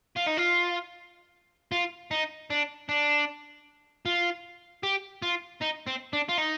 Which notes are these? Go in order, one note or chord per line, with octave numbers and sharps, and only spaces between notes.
F4
D#4
F4
F4
D#4
D4
D4
F4
G4
F4
D#4
C4
D4
F4
D#4